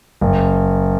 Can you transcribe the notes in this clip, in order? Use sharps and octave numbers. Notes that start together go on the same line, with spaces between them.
F#1